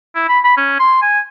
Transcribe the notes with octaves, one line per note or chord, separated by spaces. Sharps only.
E4
B5
B5
C#4
C6
G#5